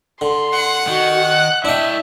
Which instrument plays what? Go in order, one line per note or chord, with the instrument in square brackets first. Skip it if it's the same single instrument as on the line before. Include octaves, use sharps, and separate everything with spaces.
[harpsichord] D3 [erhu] C6
[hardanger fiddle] F#5
[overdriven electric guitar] D#3 [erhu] F#4
[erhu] F#6
[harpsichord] D4 D#5 [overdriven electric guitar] E4 G5 [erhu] E5